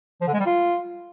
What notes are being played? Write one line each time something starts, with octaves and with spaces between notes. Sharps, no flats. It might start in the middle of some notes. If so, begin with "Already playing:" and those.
F3
D3
G#3
G3
F4